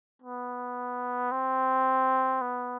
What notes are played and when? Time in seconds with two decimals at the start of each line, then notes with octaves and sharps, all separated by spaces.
0.22 B3
1.32 C4
2.41 B3